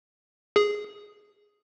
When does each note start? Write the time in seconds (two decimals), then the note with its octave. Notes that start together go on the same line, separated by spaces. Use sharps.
0.56 G#4